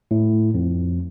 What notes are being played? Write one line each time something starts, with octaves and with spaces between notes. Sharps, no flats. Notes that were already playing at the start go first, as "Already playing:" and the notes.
A2
F2